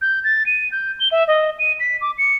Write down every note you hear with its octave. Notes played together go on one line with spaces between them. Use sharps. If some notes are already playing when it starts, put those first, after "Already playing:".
G6
A6
D#7
G6
G7
E5
D#5
D#7
B6
D6
C#7